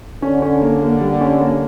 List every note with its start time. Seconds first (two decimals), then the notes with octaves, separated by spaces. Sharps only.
0.22 D3 C#4
0.42 C#4
0.62 A#3
0.82 A#3
1.01 G3
1.21 C#4
1.41 A#3